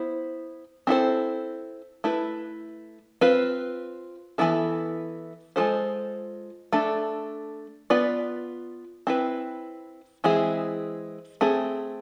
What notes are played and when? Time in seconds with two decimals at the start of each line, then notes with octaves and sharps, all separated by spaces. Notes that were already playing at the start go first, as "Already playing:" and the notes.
Already playing: B3 E4 C5
0.87 C4 E4 A4 C5
2.04 A3 E4 B4
3.21 C4 F4 B4
4.38 E3 G#3 B3 E4 A4
5.56 G#3 B3 F4 A4 C5
6.73 A3 D4 A4
7.90 B3 F4 B4 D5
9.07 C4 E4 B4
10.24 E3 G#3 C4 E4 G#4
11.41 A3 C4 G#4